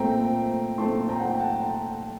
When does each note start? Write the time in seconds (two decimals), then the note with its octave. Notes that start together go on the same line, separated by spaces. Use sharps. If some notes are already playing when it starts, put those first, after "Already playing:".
Already playing: A#2 A3 C4 G5 A#5
0.78 A#2 A3 C4 A5 C6
1.09 G5 A#5
1.20 F#5
1.30 G5
1.39 F#5 A5